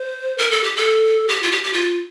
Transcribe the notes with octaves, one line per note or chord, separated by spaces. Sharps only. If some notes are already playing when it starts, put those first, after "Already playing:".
Already playing: C5
A#4
A4
G4
A4
G4
F4
G4
G4
F4